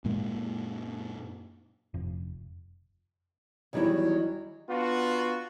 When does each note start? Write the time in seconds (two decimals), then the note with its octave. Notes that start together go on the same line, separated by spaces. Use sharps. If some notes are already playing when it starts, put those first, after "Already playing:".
0.04 F#2 A#2 G#3 A#3
1.94 F1
3.73 E2 D#3 F#3 G3 D#4 E4
4.69 B3 D4 F4 F#4